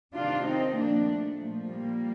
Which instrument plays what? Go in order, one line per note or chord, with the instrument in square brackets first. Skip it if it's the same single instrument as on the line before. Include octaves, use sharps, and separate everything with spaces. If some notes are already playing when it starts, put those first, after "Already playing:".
[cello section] C3 D#3 D4 F4
C4 D#4
A#2 F3 A#3 D4
A3
A#2 F3
G3 A#3